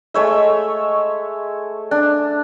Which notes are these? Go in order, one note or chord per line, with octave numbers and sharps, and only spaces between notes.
G#3 A3 C#5 E5
D4